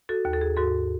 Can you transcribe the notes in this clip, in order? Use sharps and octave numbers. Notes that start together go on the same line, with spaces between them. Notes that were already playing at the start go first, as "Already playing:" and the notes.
F#4 A4
D#2
A4
G#4
G#2 F#4 A4